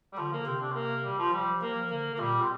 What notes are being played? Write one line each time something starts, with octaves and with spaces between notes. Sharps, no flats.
G3
D3 F3
A#3
C3 C4
D4
C4
A#3
G3
F3
F3 G3
F3 A#3
D3 A#3
A#3
A#2 G3
C4